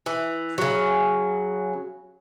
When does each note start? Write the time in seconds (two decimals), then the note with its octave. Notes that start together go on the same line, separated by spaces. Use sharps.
0.06 E3
0.58 C#3 F#3